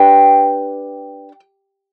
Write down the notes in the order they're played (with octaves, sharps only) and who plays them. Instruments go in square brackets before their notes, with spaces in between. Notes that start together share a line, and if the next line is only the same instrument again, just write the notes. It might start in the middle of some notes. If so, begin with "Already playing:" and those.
Already playing: [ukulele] D4 G4 B4 G5